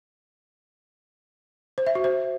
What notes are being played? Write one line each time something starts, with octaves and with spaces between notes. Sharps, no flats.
C5
E5
F#4
C5